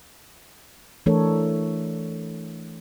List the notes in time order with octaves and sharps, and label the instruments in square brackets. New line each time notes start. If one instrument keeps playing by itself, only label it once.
[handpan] E3 A3 D4 A4 A#4 C#5